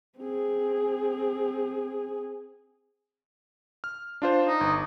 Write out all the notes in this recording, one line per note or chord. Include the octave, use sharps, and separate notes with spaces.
C4 G#4
F6
D4 F4 C5
D#4
G1